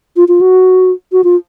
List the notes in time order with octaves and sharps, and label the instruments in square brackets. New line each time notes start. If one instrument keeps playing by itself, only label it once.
[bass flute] F4
F4
F#4
F#4
F4